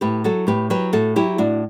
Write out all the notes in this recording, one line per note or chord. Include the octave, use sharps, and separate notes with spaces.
A2 G4 B4
F#3 F#4 A4
A2 G4 B4
F#3 G4 B4
A2 F#4 A4
F#3 E4 G4
A2 D4 F#4